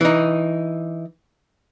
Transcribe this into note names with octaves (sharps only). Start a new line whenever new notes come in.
E3 D#4